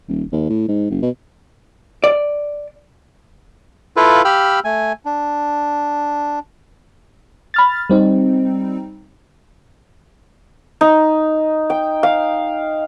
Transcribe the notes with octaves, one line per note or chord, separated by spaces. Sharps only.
D#1
D#2
A2
G#2
F#1
B2
D5
E4 F4 A4 B4 F5
G4 F5 G5 B5 E6 F6
A3 G#5
D4
B5 F6 A6
G3 C4 D#4
D#4
G5
F5